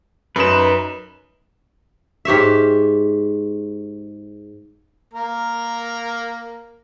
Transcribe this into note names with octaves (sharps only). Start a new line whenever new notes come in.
F#2 D#4 B4 E7
G#2 G4 C#5 E5
A#3 A#4